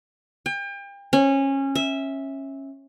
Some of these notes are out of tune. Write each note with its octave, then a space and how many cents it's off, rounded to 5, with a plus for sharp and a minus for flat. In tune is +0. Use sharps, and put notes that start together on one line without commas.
G5 +35
C#4 -20
E5 -10